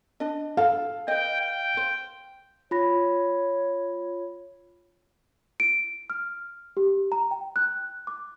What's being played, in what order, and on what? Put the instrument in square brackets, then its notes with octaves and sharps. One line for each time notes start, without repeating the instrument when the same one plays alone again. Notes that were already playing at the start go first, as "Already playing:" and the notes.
[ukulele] D4 D#5
[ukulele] A4 [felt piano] F5
[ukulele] B4 D#5 [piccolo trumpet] G5
[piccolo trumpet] G5
[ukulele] C5
[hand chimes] F4 B5 A#6 [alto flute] C#5
[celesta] D7
F6
G4
A#5
G5
F#6
D6